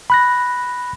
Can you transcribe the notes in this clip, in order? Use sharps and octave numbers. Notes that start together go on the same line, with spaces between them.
B5 F#6 A#6